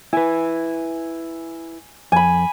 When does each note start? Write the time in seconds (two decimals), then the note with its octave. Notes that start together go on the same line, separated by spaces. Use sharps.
0.13 E4 B4 G#5
2.12 F2 G#5 B5